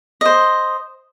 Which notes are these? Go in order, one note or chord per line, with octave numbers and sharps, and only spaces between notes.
C5 D#5